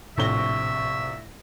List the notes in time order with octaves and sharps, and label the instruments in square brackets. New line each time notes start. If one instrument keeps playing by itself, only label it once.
[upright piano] A#1 C3 G7 [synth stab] A2 A#6 [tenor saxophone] E5 [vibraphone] C#6